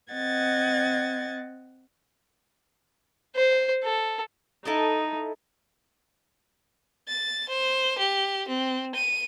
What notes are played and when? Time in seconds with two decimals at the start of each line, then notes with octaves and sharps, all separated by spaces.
0.13 C4 D#5 F#5 G#6 A6
3.36 C5
3.83 A4
4.65 D#4 E4 A4 D#5
7.08 A6
7.49 C5
7.98 G4
8.48 C4
8.95 D#7